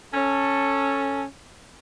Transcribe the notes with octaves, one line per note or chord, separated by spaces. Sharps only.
C#4 A4